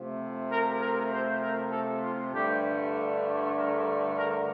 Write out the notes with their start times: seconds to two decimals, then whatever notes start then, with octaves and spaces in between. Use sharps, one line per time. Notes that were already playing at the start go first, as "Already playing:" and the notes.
Already playing: C3 F3 A3
0.49 A#4
0.80 A#4
1.11 C5
1.41 A#4
1.71 A4
2.02 F4
2.32 G2 D3 A3 G4
3.55 A#4
4.17 A#4